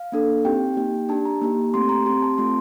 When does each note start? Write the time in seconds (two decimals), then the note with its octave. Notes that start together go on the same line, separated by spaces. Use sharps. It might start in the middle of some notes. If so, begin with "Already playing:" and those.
Already playing: F5
0.12 A#3 D4 A4
0.45 C4 D#4 G4 G5
0.77 A#3 D#4 G4
1.09 D4 G4 A5
1.25 A#5
1.41 A#3 D#4 G4
1.74 A3 C4 G4 C6
1.89 A#5
2.06 C4 G4 C6
2.22 A5
2.38 A3 C4 F4 C6